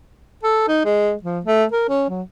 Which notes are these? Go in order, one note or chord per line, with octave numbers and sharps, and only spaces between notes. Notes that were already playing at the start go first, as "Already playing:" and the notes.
A4
D#4
G#3
F3
A3
A#4
C#4
F#3